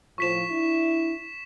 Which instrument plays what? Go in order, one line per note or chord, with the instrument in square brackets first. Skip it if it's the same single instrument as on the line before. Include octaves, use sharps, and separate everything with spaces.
[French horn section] A2 F3 [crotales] C#6 B6 E7
[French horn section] D4 E4